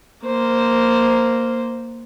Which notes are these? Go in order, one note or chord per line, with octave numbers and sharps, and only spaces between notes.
A#3 C5